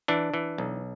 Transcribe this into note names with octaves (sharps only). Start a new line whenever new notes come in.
E3 D4
E3
B1